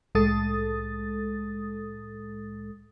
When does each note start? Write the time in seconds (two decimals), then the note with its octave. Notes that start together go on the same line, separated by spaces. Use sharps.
0.15 C2 A2 G#3 A4 D#6 A6